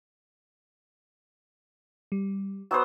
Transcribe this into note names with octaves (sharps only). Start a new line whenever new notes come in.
G3
F#3 B3 C5 E6